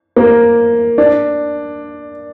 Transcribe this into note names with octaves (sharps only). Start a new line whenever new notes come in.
A#3
D4